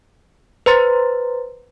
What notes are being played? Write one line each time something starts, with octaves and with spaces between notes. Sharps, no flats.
B4 C5 A#5 C6 A6